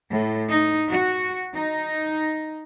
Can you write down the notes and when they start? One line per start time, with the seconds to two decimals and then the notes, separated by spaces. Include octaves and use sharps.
0.11 A2
0.51 D#4
0.89 F#4
1.55 D#4